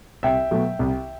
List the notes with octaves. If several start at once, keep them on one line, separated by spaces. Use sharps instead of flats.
C2 E5 G5
B2 F#3 A3
C2